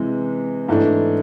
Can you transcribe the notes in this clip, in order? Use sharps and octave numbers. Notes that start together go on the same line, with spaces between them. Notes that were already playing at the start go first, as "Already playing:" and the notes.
Already playing: C3 E3 G#3
G#2 E3 A3 D4